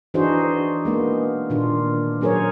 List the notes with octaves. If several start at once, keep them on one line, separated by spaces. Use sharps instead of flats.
E3 D4 D#4 F#4 G#4 C5
G#3 A#3 B3
A#2 D#3 D4 F4
F#3 C#4 G#4 A#4 C5 C#5